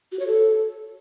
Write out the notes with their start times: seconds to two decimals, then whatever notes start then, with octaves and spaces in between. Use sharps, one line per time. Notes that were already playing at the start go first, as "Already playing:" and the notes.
0.12 F#4
0.19 C#5
0.27 A4